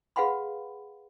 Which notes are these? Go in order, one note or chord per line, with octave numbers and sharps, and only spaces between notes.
G#4 B4 F5 F#5 B5 C6